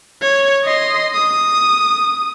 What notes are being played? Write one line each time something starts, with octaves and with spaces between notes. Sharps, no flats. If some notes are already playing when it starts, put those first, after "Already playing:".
C#5
D#5 C6
D#6